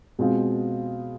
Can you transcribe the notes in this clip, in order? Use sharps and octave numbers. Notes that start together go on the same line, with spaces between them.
B2 G#3 C4 F4